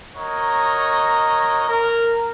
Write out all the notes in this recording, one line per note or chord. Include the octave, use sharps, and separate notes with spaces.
F#4 A#4 C#5 D#5 A#5
A#4